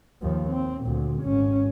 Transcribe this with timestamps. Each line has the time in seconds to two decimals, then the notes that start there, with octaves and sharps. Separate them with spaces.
0.22 D#2 F3
0.51 C4
0.84 D2 A#2
1.23 G#1 C#4